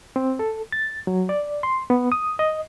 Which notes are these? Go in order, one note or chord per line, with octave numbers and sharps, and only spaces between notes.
C4
A4
A6
F#3
D5
C6
B3
D#6
D#5